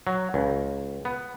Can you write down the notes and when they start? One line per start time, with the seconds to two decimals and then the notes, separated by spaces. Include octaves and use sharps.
0.07 F#3
0.34 C#2
1.05 B3